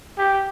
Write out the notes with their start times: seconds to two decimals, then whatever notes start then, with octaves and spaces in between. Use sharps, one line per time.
0.18 G4